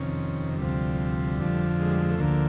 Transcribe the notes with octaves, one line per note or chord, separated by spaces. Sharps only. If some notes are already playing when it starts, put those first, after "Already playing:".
Already playing: F2 C3 D#3 C#4
D2 C3 F3 G3
F2 D3 F3
G#3
G3
G#3
A3
D2 D3 F3 A#3